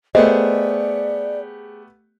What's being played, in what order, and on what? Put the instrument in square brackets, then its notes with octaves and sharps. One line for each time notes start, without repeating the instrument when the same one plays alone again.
[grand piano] A3 B3 G4 [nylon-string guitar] G#4 C5 [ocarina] D5 [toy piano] D#5